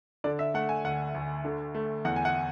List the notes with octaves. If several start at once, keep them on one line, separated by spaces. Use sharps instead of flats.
D3 D5
E5
A3 F#5
G#5
D2 F#5
D2
D3
A3
E2 F#5
G#5
F#5